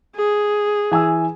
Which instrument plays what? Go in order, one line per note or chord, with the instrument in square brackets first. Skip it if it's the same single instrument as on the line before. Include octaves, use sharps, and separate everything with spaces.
[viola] G#4
[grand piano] E3 G#5 E6